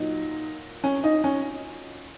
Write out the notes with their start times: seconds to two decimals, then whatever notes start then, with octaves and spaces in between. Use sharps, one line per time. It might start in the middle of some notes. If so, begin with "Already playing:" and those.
Already playing: A#2 F#3 D#4
0.84 C#4
1.04 D#4
1.24 C#4